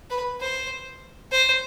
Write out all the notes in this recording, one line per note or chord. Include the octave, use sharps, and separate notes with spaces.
B4
C5
C5